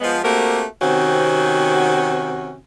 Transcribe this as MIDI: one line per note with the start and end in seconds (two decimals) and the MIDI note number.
0.01 0.19 53
0.01 0.19 56
0.01 0.19 59
0.23 0.64 57
0.23 0.64 58
0.23 0.64 60
0.23 0.64 66
0.23 0.64 67
0.23 0.64 70
0.82 2.56 48
0.82 2.56 51
0.82 2.56 60
0.82 2.56 61
0.82 2.56 66